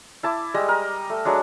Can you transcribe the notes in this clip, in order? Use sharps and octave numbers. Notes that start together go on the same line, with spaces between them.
E4 A5 D6
G3 G#3 D#5
A#4
A3
F#3 G#3 D4